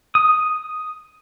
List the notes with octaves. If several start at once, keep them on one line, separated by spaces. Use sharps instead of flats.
D#6